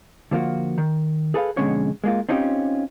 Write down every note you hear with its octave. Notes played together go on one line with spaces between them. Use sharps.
D3 F3 A#3 F4 F#4
D#3
G#4 A4 B4 D#5 F5
F2 B2 D3 G#3 C#4 C#5
G#3 A#3 F4
C4 C#4 D#4 F4 G4